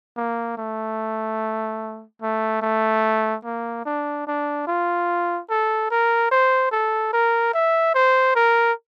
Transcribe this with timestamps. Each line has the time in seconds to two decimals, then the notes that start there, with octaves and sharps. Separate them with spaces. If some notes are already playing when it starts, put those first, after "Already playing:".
0.17 A#3
0.57 A3
2.22 A3
2.62 A3
3.44 A#3
3.86 D4
4.27 D4
4.67 F4
5.50 A4
5.91 A#4
6.31 C5
6.72 A4
7.13 A#4
7.54 E5
7.95 C5
8.36 A#4